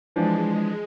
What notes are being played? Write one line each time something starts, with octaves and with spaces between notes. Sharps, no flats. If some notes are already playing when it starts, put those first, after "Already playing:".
E3 F3 G#3 D4